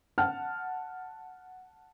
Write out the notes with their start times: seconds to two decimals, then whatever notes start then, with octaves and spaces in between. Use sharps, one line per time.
0.18 F#5 A5 F6